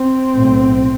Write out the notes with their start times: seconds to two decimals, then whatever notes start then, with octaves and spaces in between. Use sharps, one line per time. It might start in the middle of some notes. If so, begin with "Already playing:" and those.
Already playing: C4
0.34 B1 A2